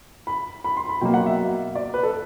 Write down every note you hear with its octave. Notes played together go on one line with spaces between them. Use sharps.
B5
B5
C6
B5
B2 F#3 A#3 G5
F#5
E5
D5
B4
A4